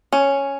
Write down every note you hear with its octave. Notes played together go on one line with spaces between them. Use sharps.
C#4